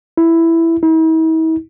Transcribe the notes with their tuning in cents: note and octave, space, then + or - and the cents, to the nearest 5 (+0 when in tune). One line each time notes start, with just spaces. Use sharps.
E4 +5
E4 -45